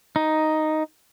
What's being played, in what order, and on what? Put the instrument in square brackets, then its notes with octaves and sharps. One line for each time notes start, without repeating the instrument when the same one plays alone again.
[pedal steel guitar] D#4